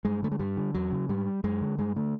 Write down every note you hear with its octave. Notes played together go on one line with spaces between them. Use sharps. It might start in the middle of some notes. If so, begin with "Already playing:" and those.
G2 G#3
D3 A3
G#3
G2 G3
D3
E2 F#3
C#3
G#2 G3
F#2 G#3
D3
G2 G#3
D3 A3